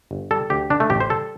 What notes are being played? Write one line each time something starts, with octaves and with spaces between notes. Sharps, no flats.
G1
G3 A4
D2 G4
D3 D4
A3
A1 G4
C5
G3 A4